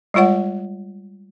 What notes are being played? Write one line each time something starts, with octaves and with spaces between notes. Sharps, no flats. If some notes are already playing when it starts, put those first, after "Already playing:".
G3 G#3 F4 C#5 F#5